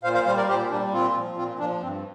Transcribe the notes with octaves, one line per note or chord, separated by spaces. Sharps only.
A#2 C5 F5
C5 F5
G3 C5 F5
A#4 D5
A#2 G4 C5
G3 A#3 D4
A#2 C4 F4
F3
A#2 C4 F4
F3 A#3 D4
G2 C4